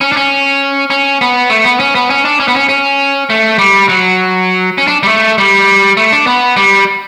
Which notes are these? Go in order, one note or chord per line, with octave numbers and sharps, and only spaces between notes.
C#4
D4
C#4
C#4
B3
A3
B3
C#4
B3
C#4
D4
C#4
B3
C#4
C#4
A3
G3
F#3
C#4
D4
G3
A3
G3
A3
D4
B3
G3